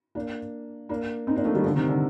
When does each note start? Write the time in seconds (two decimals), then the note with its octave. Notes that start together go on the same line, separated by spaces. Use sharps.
0.15 A#3 D4
0.89 A#3 D4
1.27 C4 D#4
1.36 A#3 D4
1.45 F3 A3
1.54 D#3 G3
1.64 D3 F3
1.76 C3 D#3
1.89 D3